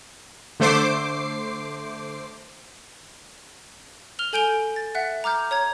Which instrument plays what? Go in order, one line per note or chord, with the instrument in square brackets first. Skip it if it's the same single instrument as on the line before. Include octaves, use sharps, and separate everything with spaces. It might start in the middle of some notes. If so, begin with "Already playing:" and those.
[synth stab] D3 A3 C5 D6 C7
[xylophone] F6 F7 G7
A4 G#5 G6 D7 F7 G7
A6
E5 F#5 F#6
A#5 D6 F6 G6
C#5 A#5 G#6